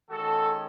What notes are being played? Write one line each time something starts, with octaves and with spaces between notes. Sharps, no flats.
D#3 G#3 C#4 F#4 A4